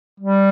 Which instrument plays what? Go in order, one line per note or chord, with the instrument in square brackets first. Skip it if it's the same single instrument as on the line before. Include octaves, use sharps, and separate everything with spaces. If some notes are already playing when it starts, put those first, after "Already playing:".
[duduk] G3